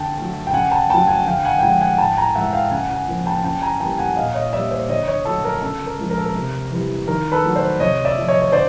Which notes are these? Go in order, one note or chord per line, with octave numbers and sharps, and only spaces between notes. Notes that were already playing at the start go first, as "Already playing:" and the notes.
Already playing: D3 G5 A5
F#3 A3
G5
C#3 F#5 G#5
G5 A5
F#3 A3 G5 A5
F#5 G#5
D3 F5 G5
F#5 G#5
G5
F3 G#3 F#5 G#5
F#5 G#5
A2 G5 A5
G#5 A#5
E3 G#3 E5 F#5
F5 G5
C#3 F#5 G#5
F#5 G#5
F3 A#3
G5 A5
C#3 G5 A5
G#5 A#5
E3 G3 A#3 G5 A5
F#5 G#5
A#2 D#5 F5
C#5 D#5
G3 A#3 D5 E5
C5 D5
D3 C#5 D#5
C#5 D#5
F#3 A3 A4
A#4
C#3 A4
A#4
F3 G#3
A#4
A4
A#4
C3
E3 G3
D#3 A#4
A4 B4
F#3 A3
C5 D5
C3 C#5 D#5
D5 E5
F3 A3
C#5 D#5
C#5
D3 C5 D5